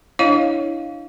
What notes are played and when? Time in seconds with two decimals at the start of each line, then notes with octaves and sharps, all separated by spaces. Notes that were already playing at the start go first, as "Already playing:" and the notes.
0.19 D4 E4 C#5 D#5 F5